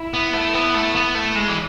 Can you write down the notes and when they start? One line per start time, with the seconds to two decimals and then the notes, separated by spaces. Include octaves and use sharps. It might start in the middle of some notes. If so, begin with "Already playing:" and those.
Already playing: E4
0.14 B3
0.33 A3
0.54 B3
0.74 A3
0.95 B3
1.15 A3
1.35 G#3
1.48 E3